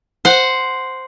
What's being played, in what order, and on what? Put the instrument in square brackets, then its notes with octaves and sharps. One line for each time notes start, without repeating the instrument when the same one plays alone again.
[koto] C5 F#5